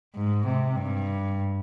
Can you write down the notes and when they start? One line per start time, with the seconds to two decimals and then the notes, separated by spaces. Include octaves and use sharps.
0.15 G#2
0.46 C3
0.76 G2